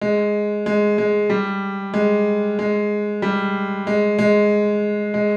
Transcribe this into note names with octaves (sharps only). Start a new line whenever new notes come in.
G#3
G#3
G#3
G3
G#3
G#3
G3
G#3
G#3
G#3